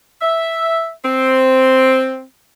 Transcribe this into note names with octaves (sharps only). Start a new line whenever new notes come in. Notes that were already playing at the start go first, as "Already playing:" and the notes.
E5
C4